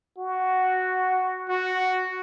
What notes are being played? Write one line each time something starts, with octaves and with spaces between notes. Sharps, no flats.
F#4
F#4